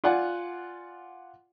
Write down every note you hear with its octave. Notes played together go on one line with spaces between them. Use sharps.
F4 D5 F#5 G#5